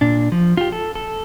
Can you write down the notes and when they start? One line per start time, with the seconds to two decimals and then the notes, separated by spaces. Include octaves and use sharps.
0.01 A#2 D4
0.32 F3
0.57 F4 G4
0.72 A4
0.95 A4